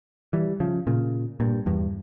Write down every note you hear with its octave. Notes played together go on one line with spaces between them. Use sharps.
E3 G3
C#3 F3
A#2 C#3
G2 A#2
E2 G2